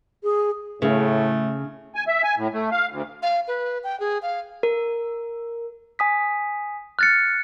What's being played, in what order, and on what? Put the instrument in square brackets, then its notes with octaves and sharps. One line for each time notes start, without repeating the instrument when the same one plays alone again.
[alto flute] G#4
[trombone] A2 [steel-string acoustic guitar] C#3 [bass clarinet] A3
[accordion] G#5
E5
G#5
A2
A3
F5
D2
[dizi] F5
B4
G5
G#4
F5
[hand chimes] A#4
G#5 D#6 B6
[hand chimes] F6 [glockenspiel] F#6 A6 C#7